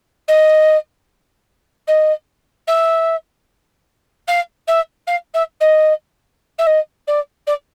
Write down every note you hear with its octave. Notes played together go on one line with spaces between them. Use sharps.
D#5
D#5
E5
F5
E5
F5
E5
D#5
E5
D#5
D5
D5